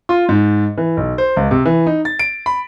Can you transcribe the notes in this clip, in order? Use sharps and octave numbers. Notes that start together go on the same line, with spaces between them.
F4
G#2
E3
B1
C5
C#2
C3
E3
D#4
A6
D7
B5